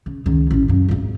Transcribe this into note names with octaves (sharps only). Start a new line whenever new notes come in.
C#3
C#2 D#3
A1 C#4
F#2 C#3
G#1 D2